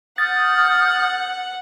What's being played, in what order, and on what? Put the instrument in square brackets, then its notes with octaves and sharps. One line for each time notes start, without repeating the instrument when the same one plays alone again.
[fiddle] F#5 [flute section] D#6 F6 G6 [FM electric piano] A6